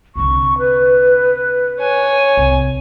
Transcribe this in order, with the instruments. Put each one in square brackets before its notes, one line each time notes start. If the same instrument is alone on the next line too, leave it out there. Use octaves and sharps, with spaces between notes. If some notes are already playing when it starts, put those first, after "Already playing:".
[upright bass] C2 D3 [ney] C#6
[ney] B4
[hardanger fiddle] C#5 G#5
[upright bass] C2